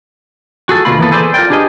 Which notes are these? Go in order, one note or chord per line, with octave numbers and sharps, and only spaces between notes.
F#4 G#4 A4
D2 B2 A#3 F4 B5
E3 A#3 B3 A4 B4
G#4 A4 B4 C5 D5
F4 A#4 C5 D5 G5
D4 G4 G#4 B4 D#5